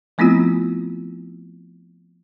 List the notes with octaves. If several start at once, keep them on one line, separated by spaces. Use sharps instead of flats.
F3 A3 B3 C4 E4 F4